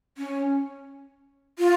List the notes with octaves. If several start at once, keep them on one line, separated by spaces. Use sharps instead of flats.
C#4
F4